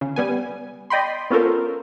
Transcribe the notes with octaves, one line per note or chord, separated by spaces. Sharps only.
C#3
G3 B3 G#5
D5 D#5 G5 B5 C6
B3 C#4 F4 A4 A#4 C5